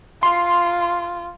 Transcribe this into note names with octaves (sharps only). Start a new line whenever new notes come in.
F4 C6